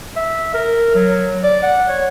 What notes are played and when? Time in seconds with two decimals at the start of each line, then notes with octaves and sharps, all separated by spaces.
0.16 E5
0.54 A#4
0.95 F#3
1.44 D5
1.63 F#5
1.89 C#5